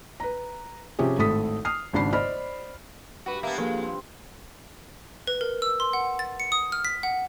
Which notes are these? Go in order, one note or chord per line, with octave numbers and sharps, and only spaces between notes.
B4 A#5
C3 F3 C#4 G4 G#4
G#1 A2 A4 D#6 B6
D#6 F6 C7
G#1 C#3 D4 B5 C7
C5 D5 D#5 B5 F6
G2 F#4 G4 B4
A#3 B3 E5 A5
F3 A#3 G#4 A4
C4
B4
A#4
E6
C6
F#5
A6
C#7
D#6
F6
B6
F#5